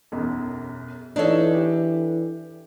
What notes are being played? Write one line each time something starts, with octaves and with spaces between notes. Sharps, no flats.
E1 B1 F#2
E3 D4 D#4 A4 C#5 D#5
G4